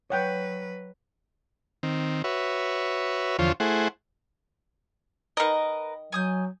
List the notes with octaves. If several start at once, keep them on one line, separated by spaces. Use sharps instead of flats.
F#3 B4 C#5 F#5 G5
D#3 C4
F#4 B4 C#5 E5
E2 D3 F3 F4 C5 C#5
A3 E4 G#4 C5 F#5
D#3 A#4 B4 D#5
F#3 G#5 D#6 G6